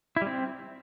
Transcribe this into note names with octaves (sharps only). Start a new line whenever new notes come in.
E4
G3
C4